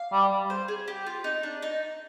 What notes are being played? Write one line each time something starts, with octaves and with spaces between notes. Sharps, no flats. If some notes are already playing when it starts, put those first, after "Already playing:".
Already playing: F5
G3
C5
G#4
G4
F4
D#4
D4
D#4